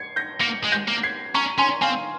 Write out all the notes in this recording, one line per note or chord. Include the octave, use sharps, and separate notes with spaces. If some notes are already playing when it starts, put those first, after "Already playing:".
Already playing: G#6 C7 C#7
G6 A#6
A#3 A#6 C#7
G#3
G6 A#6
A#3
G#6 C7
C#4 A#5 C#6
C#4 G#5 C6
C4 F5 G#5